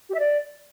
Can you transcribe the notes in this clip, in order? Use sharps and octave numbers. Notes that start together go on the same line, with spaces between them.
G4
E5
D5